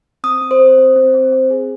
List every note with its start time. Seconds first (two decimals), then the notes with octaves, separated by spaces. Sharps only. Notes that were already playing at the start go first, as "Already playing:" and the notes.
0.24 C4 D#6
0.41 C4
0.51 C5
0.60 C4
0.78 C4
0.96 C4
1.14 C4
1.32 C4
1.50 G#4